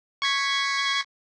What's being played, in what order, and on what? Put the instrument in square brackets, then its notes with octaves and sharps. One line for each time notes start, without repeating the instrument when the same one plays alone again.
[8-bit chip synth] C#6 G#6 B6